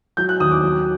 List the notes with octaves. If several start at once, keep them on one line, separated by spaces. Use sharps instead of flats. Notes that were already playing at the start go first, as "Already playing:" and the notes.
F#3 G6
F#6
D#2 D#6
D6
F#3